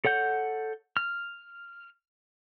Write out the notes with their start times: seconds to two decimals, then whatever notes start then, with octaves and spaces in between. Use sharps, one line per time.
0.05 A4 C#5 F#5 G6
0.97 F6